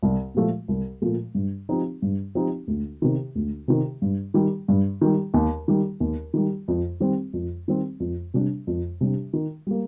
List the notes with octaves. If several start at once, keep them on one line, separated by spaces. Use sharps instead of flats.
C2
A#2 F3 A3
C2
A#2 F3 A3
G2
F3 C4 D#4 G4
G2
F3 C4 D#4 G4
D2
C3 D#3
D2
C3 D#3
G2
D#3 G3
G2
D#3 G3
D#2
D#3 G3
D#2
D#3 G3
F2
D#3 G3 C4
F2
D#3 G3 C4
F2
C3 G3 D4
F2
C3 G3 D4
D#3
G3 A#3